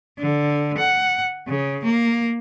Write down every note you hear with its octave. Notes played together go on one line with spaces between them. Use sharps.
D3
F#5
C#3
A#3